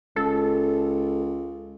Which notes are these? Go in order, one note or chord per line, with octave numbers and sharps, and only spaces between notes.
C#2 A4